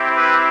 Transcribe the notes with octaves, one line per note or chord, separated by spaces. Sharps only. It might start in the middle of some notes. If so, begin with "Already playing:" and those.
Already playing: C4 E4 G4
B4